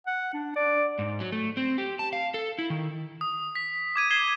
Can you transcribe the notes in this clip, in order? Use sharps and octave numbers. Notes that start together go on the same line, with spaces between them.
F#5
D4
D5
G#2
F#3
A3
C4
G4
A5
F5
A4
E4
D#3
D#6
B6
D6 G#6 D#7
G#6 C7 E7 G7